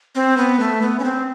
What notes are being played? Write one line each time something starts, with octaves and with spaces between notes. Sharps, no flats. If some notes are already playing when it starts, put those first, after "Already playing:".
C4
B3
A3
B3
C#4
C4